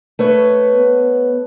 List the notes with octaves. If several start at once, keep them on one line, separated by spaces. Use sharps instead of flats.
A3 B4 C#5
B3